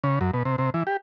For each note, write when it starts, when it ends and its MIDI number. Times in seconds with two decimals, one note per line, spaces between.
0.04 0.19 49
0.21 0.31 42
0.34 0.43 47
0.45 0.56 48
0.58 0.70 48
0.74 0.83 52
0.87 0.97 67